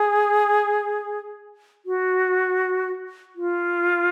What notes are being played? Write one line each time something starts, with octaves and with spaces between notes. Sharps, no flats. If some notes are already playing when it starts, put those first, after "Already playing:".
Already playing: G#4
F#4
F4